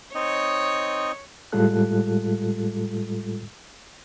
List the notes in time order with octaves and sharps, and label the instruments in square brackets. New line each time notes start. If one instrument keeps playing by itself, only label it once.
[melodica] C4 D#4 D#5 [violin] C#5
[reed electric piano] A2 G3 G#3 F4 A4 F#6